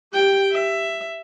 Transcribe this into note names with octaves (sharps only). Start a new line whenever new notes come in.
G4 G5
E5